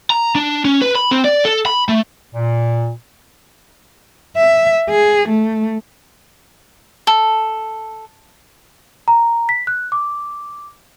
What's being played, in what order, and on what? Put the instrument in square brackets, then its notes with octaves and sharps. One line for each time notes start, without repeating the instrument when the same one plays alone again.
[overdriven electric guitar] A#5
D4
C#4
B4
B5
C4
D5
A4
B5
A3
[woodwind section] A#2
[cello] E5
G#4
A3
[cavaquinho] A4
[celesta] A#5
B6
F#6
D6